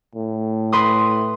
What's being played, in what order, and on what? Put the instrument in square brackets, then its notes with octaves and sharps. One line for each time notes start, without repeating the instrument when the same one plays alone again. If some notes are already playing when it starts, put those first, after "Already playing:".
[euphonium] A2
[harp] B4 C6 D#6